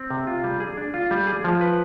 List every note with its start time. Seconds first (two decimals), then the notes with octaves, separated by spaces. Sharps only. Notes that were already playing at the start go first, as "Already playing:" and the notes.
Already playing: C4
0.10 C3
0.27 F4
0.44 G3
0.60 G#4
0.77 D4
0.94 F4
1.11 G3
1.27 G#4
1.44 F3
1.61 B4